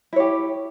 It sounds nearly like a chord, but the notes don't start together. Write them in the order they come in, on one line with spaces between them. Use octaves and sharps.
E4 C#5 G4